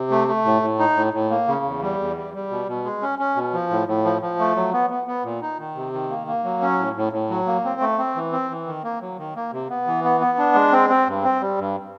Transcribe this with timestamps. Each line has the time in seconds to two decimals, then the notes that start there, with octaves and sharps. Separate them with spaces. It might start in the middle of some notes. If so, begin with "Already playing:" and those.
Already playing: C3
0.11 A3
0.28 A3
0.45 A2
0.62 A2
0.79 D#4
0.96 A2
1.13 A2
1.30 A#3
1.48 C#3
1.65 E2
1.82 G3
1.99 E2
2.16 G3
2.34 G3
2.50 B2
2.68 B2
2.84 G#3
3.02 C#4
3.19 C#4
3.36 B2
3.53 F3
3.70 A2
3.87 A2
4.05 F3
4.22 F3
4.39 A3
4.56 F#3
4.73 B3
4.90 B3
5.07 B3
5.24 A#2
5.41 D#4
5.59 D#3
5.75 C3
5.93 D#3
6.10 A#3
6.27 A#3
6.44 F#3
6.62 C#4
6.78 A2
6.96 A2
7.13 A2
7.30 F#3
7.47 A#3
7.64 C4
7.81 A3
7.98 C4
8.16 E3
8.32 C4
8.50 E3
8.67 D#3
8.84 A#3
9.01 F#3
9.18 D#3
9.36 A#3
9.52 C3
9.70 B3
9.87 E3
10.04 B3
10.21 B3
10.38 D4
10.55 G#3
10.73 C4
10.90 C4
11.07 G2
11.23 C4
11.41 G3
11.58 G2